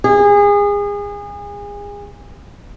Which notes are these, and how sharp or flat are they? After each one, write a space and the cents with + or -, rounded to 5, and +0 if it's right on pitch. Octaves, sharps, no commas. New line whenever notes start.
G#4 -30